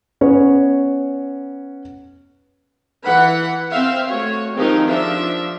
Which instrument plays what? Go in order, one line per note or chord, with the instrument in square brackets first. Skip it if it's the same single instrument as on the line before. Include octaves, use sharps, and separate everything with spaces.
[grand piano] B3 C#4 C#5
[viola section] E3 F#5 B5
C4 E5 F5
A3 F#4 C#5
D#3 F3 G#3 C4 D#4 G4
F3 D4 F4 E5